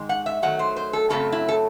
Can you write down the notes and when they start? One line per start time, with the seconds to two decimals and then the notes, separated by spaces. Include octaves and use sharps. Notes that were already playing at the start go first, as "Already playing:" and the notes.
Already playing: G#2 D#3 G#3
0.09 F#5
0.26 E5
0.42 D#3 F#3 A3 F#5
0.59 C5
0.76 C5
0.93 A4
1.09 F#2 C#3 F#3 A3 C4 A4
1.32 E4
1.49 A4